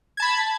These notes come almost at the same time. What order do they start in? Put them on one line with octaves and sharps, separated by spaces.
G#6 A5 B5